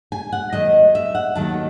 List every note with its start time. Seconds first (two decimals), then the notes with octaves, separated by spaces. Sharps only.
0.12 G#5
0.32 F#5
0.52 D#2 D#3 F#3 A3 D#5
0.95 E5
1.15 F#5
1.35 D#2 D#3 F#3 A3 A5